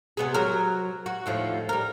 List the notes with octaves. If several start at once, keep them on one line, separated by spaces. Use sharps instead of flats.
C3 B3 G#4
F#3 A#4
F#4
D#2 A2 F3
G3 A#4